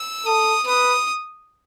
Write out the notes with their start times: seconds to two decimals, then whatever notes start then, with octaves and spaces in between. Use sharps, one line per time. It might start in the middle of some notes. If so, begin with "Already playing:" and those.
Already playing: E6
0.26 A4 D#6
0.67 B4 D#6